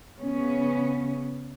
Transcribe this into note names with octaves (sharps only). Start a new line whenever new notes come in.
C#3 B3 C#4